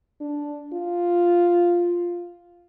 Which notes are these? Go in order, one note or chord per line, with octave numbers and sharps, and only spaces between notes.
D4
F4